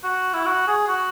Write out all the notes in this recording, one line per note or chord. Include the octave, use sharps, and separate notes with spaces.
F#4
E4
F#4
G#4
F#4